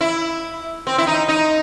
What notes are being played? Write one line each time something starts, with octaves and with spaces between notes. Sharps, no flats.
E4
C4
E4
D#4
D#4